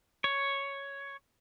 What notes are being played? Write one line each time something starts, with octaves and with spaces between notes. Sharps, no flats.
C#5